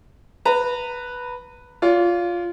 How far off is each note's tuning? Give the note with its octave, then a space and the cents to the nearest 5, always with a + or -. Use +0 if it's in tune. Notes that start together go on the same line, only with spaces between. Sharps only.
B4 -5 A#5 -30
F4 +0 D5 -45